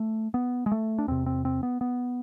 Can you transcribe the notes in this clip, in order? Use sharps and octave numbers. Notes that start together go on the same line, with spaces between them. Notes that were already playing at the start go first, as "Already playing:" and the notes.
Already playing: A3
B3
G#3
A3
D4
E2 C3 C4
C4
C4
B3
B3